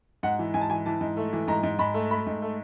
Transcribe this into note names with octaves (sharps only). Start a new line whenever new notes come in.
G#2 F#5
E3
G#2 G#5
A5
E3 G#5
E3 A5
G#2
A3
E3
G#2 A#5
G#2
G#2 B5
A3
A3 B5
G#2
A3